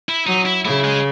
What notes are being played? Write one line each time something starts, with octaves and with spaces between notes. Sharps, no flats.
E4
F#3 D#4
E4
C#3 E4
G#3